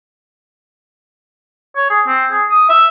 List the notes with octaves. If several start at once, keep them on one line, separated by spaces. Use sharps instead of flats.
C#5
G#4
C4
G#4
D#6
E5